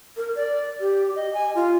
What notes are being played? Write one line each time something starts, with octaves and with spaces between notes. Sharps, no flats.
A#4
D5
G4
D#5
G#5
F4